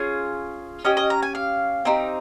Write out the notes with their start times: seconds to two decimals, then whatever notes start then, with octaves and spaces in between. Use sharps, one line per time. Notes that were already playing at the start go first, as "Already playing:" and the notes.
Already playing: C#4 F4 G#4
0.85 C#4 G4 D#5
0.97 D#5
1.10 A#5
1.23 G#5
1.35 F5
1.85 C4 D#4 G4